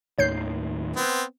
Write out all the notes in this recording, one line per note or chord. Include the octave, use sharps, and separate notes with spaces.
D#2 A2 D#3 C#5 G6 C7
B3 C4